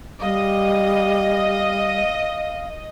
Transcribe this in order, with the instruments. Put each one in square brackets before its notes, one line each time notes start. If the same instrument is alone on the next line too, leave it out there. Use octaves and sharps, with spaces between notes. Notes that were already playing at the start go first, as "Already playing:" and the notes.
[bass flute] G3 [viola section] D#5 [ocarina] F5